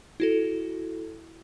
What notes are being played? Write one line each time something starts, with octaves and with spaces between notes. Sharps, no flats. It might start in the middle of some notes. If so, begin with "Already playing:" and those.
E4 F#4 A4